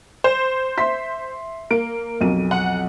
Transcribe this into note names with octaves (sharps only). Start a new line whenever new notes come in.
C5
E5 C6 B6
A#3 D7
B1 F2 D#7
F#5